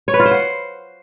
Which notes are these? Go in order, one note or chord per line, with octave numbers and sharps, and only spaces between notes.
C#5
B4
F4
C5
F#5